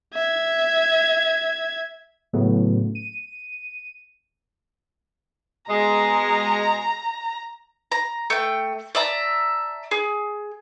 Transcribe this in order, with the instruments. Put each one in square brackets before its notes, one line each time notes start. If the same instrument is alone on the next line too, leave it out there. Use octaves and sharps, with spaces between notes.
[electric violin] E5 G#6
[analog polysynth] A2 C#3 F#3 A3 B3
D#7
[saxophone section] B2 G#3 [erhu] A#5
[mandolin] A#5
A3 G5
D5 E5 A5 A#5
G#4